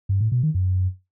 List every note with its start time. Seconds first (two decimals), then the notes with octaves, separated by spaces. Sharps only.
0.09 G2
0.20 A2
0.32 B2
0.43 D#3
0.54 F#2